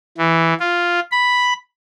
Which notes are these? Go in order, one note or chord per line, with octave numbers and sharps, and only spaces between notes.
E3
F4
B5